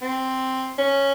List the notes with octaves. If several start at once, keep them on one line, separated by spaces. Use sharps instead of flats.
C4
C#4